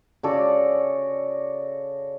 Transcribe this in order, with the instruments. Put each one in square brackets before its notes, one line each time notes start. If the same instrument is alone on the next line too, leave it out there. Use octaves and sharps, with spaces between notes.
[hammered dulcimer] C#3 F#4 A4 D5